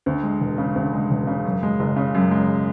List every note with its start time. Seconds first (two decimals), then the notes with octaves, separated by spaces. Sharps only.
0.06 D2
0.23 G#3
0.41 E1
0.58 C#3
0.76 D2
0.93 G#3
1.11 E1
1.27 C#3
1.45 F#2
1.63 G#3
1.80 F#1
1.96 C#3
2.15 F#2
2.31 G#3